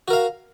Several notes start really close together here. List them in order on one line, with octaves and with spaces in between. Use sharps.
F#4 A#4 F5